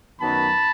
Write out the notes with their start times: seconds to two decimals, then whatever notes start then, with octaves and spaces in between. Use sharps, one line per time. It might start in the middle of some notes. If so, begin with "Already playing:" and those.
0.20 F#2 D#3 F#3 B3 D#4 A5 B5